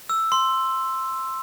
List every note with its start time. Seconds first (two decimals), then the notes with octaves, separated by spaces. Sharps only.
0.09 E6
0.32 C6